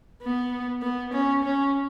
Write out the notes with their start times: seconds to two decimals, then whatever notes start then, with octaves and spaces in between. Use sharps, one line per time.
0.22 B3
0.82 B3
1.13 C#4
1.43 C#4